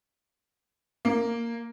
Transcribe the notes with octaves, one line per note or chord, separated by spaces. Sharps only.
A#3